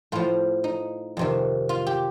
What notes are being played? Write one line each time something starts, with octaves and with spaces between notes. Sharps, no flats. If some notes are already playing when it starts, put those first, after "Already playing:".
A2 F3 F4
D#4
F2 C3 D#3
F4
G4